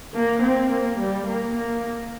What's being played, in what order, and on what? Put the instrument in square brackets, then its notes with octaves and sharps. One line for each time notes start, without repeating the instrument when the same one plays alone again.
[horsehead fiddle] A#3
C4
A#3
G3
A#3
A#3